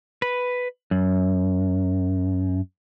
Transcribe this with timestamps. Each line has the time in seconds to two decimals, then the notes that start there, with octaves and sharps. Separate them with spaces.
0.22 B4
0.91 F#2